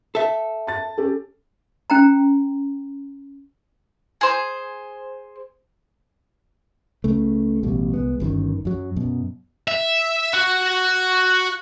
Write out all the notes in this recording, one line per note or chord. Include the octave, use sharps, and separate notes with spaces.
A4 E5
A5 A6
C#4 G4 A4
C#4 G5 A#5
G#4 C5
C#2 C#3 A3
A1 B2 G3
C2 G#3 B3
G1 F#2 D3 D#3
F#2 F#3
F#2 B2
E5
F#4